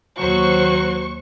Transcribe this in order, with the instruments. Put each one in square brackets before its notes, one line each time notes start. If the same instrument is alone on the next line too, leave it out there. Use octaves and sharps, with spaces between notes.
[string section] D#2 C5 C#6 [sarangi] F#3